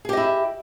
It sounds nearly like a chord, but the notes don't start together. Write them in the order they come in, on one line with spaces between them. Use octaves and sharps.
G#4 G4 D#5 E4